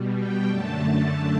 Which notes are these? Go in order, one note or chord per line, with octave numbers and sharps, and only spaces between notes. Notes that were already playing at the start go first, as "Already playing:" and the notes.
Already playing: B2 G3
G5
F#2 D3 A3 A5